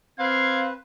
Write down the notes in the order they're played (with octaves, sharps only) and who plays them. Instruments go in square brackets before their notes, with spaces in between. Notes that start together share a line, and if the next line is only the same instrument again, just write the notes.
[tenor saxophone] C4 [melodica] B4 [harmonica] F5 [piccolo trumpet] G#6